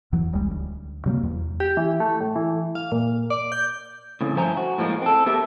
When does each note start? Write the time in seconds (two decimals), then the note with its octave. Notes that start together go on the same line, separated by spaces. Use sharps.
0.12 E2 E3 F#3
0.33 D#1 C2 G3 G#3
0.51 D2
1.06 C3 F#3 A3 A#3
1.23 E2
1.60 G4
1.77 E3
2.00 A3
2.21 A2
2.36 E3
2.75 F5
2.92 A#2
3.30 D5
3.52 G6
4.21 A2 C#3 C4
4.36 G2 F3 A3 C5 G#5 A#5
4.57 F#4
4.78 A2 F3 G#3 A#3
5.02 C4 A4
5.26 A3 B3 G4 A#4 E5